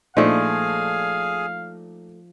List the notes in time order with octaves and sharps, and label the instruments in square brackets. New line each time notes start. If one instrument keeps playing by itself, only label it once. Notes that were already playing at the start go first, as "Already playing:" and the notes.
[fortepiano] A#2 D4 D#4 [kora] F3 A3 [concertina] G#4 G#5 [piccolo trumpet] F5